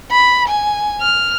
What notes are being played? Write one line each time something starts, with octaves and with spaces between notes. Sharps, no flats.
B5
G#5
F6